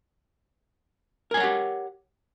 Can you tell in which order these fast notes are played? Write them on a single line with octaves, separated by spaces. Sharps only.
A#4 G#5 C#5 F#5 G4